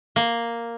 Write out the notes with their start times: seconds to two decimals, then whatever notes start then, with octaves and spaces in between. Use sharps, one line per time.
0.16 A#3